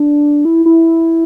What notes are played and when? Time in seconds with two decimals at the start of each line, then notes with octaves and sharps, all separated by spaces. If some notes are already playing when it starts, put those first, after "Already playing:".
Already playing: D4
0.45 E4
0.66 E4